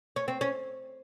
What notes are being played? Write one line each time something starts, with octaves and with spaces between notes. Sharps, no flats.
C#4
C4
C#4